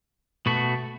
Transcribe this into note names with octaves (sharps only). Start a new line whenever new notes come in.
B2 A3 F#4